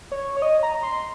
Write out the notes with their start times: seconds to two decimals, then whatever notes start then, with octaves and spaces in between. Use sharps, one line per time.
0.12 C#5
0.37 C#5
0.42 D#5
0.63 A#5
0.83 C6